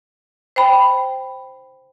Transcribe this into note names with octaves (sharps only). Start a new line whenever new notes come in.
C5 G5 B5